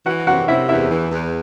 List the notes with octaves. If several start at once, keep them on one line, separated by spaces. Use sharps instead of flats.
E3 F#4 F#5
C3 F#4 F#5
C3 E4 E5
E2 E4 E5
E3
E2